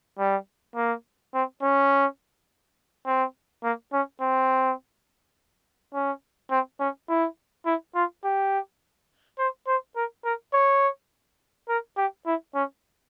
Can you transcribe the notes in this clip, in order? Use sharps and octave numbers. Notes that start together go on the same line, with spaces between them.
G3
A#3
C4
C#4
C4
A#3
C#4
C4
C#4
C4
C#4
E4
E4
F4
G4
C5
C5
A#4
A#4
C#5
A#4
G4
E4
C#4